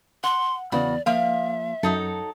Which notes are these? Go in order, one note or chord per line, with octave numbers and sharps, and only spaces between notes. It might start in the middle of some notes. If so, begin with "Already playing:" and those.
F#5 C6
E2 C#3 E3 B3 F#4 D5
F3 A#3 E5 F5
F#2 F#3 D#4 A4